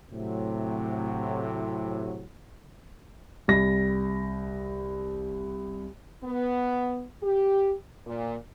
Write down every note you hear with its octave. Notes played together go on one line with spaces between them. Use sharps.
A2 C3 F#3
C2 A#6
B3
G4
A#2